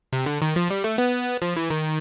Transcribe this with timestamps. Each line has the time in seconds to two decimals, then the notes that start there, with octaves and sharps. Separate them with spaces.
0.13 C3
0.26 D3
0.42 D#3
0.56 F3
0.71 G3
0.84 A3
0.98 B3
1.42 F3
1.57 E3
1.70 D#3